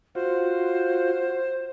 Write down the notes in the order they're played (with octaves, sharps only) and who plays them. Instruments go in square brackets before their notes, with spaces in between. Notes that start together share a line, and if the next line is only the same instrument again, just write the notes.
[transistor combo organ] F4 F#4 [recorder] C5